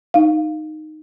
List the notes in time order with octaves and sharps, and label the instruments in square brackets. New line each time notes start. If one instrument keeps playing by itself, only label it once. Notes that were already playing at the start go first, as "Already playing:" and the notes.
[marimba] D#4 F5